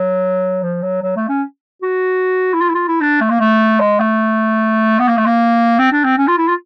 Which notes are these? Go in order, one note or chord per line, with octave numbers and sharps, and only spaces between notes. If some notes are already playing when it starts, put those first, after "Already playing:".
Already playing: F#3
F3
F#3
F#3
A3
C#4
F#4
E4
F4
E4
F4
E4
D4
A3
A#3
A3
G#3
A3
B3
A#3
A3
A#3
C4
D4
C4
C#4
F4
E4
F4